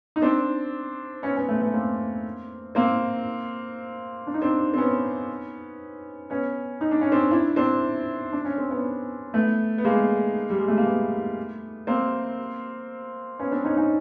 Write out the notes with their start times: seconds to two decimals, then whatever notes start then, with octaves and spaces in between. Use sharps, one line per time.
0.16 D#4
0.22 C4 D4
1.23 B3 C#4
1.36 B3 C#4
1.49 A3 B3
1.61 A3 B3
1.74 A#3 C4
2.75 A#3 C4
4.27 D4
4.34 D#4
4.42 C4 D4
4.74 C4
4.78 B3 C#4
6.30 B3 C#4
6.81 D#4
6.91 D4
7.01 C#4
7.12 C4 D4
7.31 D4 E4
7.56 C4 D4
8.33 D4
8.45 C#4
8.58 C4
8.71 B3 C#4
9.34 A3 B3
9.78 B3
9.84 G#3 A#3
10.50 G3
10.59 G#3
10.68 A3
10.77 A#3
10.86 A3 B3
11.87 A#3 C4
13.39 B3 C#4
13.52 C4 D4
13.65 C#4 D#4
13.77 C#4 D#4